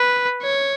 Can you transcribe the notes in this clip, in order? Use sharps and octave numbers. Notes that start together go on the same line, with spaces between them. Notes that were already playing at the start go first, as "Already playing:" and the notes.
Already playing: B4
C#5